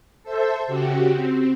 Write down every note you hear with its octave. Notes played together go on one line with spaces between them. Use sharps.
A4 C5 E5
C#3 F#4 G4
C4